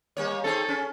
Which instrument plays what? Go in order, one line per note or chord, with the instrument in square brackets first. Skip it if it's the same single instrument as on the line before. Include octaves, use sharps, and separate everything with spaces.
[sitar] G3 A#3 C#5
[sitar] C4 D#4 G#4 [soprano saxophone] A4
[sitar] C#4